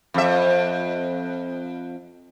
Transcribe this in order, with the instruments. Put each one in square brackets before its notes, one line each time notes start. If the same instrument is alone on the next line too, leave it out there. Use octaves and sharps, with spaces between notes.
[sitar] F2 E5